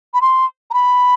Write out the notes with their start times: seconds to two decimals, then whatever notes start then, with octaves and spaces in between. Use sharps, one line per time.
0.14 B5
0.21 C6
0.71 A#5
0.74 B5